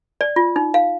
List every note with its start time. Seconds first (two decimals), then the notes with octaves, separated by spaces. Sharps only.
0.21 D5
0.36 F4
0.56 D#4
0.74 F5